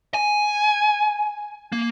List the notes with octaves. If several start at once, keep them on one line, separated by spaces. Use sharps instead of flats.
G#5
A#3